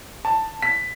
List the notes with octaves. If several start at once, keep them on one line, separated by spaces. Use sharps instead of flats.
A5
B6